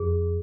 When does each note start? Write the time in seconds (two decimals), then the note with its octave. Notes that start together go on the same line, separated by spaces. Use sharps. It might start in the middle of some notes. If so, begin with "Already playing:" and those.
Already playing: F2 G#4